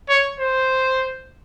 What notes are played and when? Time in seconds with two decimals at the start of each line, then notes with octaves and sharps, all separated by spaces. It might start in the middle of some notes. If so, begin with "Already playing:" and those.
0.09 C#5
0.40 C5